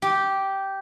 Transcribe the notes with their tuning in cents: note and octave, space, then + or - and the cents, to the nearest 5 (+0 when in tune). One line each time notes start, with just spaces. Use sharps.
G4 -10